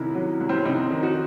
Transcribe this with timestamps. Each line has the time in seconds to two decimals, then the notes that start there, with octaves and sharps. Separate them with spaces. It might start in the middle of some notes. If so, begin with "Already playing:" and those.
Already playing: C2 C3 D#3 C#4 E4
0.15 F#3
0.40 C2
0.49 C4
0.57 C#4
0.65 C3 C4 D#4
0.90 D#3
1.03 D#4 F#4